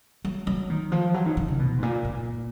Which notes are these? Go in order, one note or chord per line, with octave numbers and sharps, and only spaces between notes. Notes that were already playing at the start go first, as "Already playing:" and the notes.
F#3
F#3
D#3
F3
F#3
D#3
D#3
C#3
B2
G#2
A#2
A#2